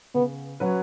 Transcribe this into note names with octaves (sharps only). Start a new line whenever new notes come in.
C#3 B3
F#3 C#4 B4